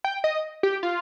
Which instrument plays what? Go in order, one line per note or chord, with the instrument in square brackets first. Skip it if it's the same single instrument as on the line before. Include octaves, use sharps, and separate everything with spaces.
[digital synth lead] G5
D#5
G4
F4